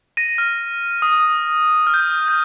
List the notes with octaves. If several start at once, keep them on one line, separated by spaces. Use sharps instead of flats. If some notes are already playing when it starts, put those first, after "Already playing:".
A#6 D#7
F6
D#6
F6
G6
F6
G6